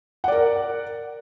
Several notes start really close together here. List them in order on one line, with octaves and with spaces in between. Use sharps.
F#5 D5 A#4